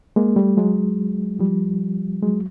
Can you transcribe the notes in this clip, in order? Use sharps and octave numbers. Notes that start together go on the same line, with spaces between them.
G#3 A#3
G3 A3
F#3 G#3
F3 G3
F#3 G#3